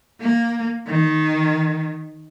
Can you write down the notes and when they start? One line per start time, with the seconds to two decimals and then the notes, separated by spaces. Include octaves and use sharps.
0.21 A#3
0.87 D#3